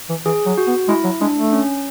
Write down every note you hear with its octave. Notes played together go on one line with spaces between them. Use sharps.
E3
E3 G#4
F#3
F#4
B3
G#3 E4
F#3
G#3 D4
A3
C#4